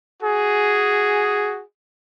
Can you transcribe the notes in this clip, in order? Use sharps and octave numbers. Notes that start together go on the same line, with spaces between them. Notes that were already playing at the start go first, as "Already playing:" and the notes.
F#4 G#4